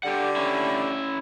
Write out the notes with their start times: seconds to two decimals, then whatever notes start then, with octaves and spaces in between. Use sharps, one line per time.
0.03 D3 G3 G4 F#5
0.36 C#4 E4